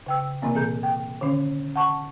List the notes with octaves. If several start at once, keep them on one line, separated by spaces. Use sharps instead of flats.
C#3 G5 E6
C3 E3 A#3 C4
A#2 G#4 G6
G5
D3 D#3 C#4
F#5 A5 C#6